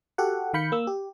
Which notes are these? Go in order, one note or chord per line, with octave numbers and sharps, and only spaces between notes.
F#4 G4 A4 F#5
D#3 F5 B5 G6 C#7
A#3 E6
G4